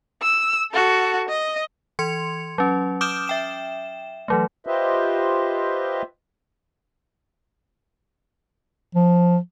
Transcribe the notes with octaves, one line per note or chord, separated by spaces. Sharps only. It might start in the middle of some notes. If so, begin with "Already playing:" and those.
E6
F#4 A4
D#5
E3 C6 G#6 C#7 F7
F#3 C#4
D6 D#6 F6 G6 D7 E7
E5 G5 E7
E3 F#3 A3
F4 G4 B4 C5 D#5 E5
F3